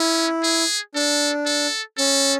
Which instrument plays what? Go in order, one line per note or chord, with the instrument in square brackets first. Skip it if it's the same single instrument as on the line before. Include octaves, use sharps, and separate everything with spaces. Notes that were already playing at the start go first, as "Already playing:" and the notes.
Already playing: [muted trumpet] C#4 [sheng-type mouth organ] E4
[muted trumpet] G#4
[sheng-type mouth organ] D4 [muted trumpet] A4
[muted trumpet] A4
[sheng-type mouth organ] C#4 [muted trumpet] A4